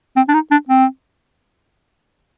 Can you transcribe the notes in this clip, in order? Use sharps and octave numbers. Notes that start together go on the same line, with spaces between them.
C4
D4
D#4
D4
C4